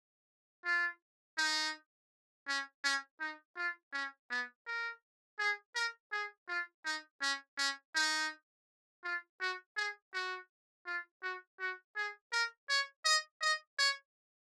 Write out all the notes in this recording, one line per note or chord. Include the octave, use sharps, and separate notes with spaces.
F4
D#4
C#4
C#4
D#4
F4
C#4
B3
A#4
G#4
A#4
G#4
F4
D#4
C#4
C#4
D#4
F4
F#4
G#4
F#4
F4
F#4
F#4
G#4
A#4
C#5
D#5
D#5
C#5